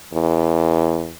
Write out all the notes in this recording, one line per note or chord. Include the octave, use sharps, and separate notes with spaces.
E2